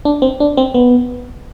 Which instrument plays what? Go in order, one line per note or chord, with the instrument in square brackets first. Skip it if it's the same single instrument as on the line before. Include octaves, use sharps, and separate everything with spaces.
[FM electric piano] D4
C4
D4
C4
B3